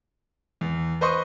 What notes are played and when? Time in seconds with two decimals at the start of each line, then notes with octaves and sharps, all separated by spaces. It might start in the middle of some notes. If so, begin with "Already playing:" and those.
0.61 E2
1.01 B4 C5 D#5 C6 C#6 D#6